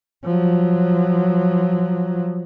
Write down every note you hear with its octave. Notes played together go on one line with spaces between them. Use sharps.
F3 F#3